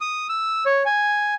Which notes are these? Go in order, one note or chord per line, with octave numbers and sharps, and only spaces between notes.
D#6
E6
C#5
G#5